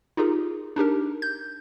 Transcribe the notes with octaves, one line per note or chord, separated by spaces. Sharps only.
D#4 F4 G4 G#4 A#4
D4 D#4 G4 A#4
G6